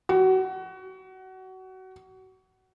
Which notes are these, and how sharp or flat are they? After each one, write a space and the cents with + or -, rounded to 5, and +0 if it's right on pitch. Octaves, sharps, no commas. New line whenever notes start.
F#4 +25